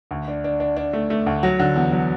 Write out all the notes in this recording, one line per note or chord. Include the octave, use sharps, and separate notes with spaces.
D2
D4
D4
D4
D4
A3
A3
D2
F#3
D3
E2
F#3